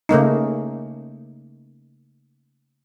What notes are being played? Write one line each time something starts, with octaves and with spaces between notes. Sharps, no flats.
C#3 A3 A#3 D#4